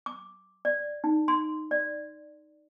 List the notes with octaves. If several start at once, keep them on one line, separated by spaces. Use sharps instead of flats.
D6
D5
D#4
C6
D5